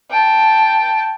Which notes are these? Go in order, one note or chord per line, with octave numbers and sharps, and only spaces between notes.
G5 A5